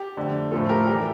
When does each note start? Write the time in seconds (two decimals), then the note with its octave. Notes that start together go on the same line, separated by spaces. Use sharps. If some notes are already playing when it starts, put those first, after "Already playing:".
Already playing: G4
0.17 F2 D3 A3
0.51 A2 F3 A3 A4
0.69 G4 A#4
0.87 E3 G3 G4